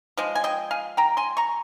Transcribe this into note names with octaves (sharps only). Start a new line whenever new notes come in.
F3 G#3
G#5
D#5 G5
F5 G#5
G5 A#5
G#5 C6
A#5 C#6